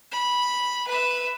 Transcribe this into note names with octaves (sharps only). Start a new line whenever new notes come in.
B5
B4 E5